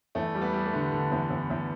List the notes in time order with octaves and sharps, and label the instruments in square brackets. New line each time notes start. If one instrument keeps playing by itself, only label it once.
[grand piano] E2 A3
G3
B3
G3
A3
D3
D3
E2
E2
E2